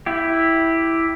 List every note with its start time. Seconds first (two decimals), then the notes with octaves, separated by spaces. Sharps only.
0.06 E4 G4